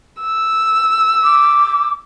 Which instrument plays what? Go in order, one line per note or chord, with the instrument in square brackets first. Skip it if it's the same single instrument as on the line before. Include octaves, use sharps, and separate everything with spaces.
[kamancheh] E6
[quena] D6